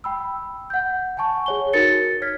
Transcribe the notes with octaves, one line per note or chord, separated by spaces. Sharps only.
G5 B5 E6
F#5 G6
F#5 G#5 A5 C#6
G#4 C#5 G7
D#4 F#4 A#4 A6 C#7
C#5 F6 G#6 B6